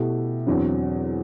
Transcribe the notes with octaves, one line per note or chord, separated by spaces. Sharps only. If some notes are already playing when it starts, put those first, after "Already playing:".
Already playing: B2 A3 E4 G4
E2 D3 F#3 C4